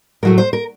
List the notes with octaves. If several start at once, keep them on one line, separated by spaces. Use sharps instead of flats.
A2 F#3 A3 A#4
C5
A#4